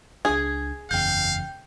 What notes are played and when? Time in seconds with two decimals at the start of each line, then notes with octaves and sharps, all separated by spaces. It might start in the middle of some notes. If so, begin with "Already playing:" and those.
0.25 C#2 D4 G#4 G#6
0.91 F#1 E2 C#3 F5 G5 G6